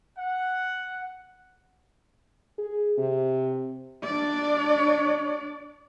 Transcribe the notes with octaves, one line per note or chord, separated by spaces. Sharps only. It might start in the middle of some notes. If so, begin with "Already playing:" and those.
F#5
G#4
C3
D4 D5